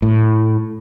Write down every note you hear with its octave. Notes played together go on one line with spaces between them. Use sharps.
A2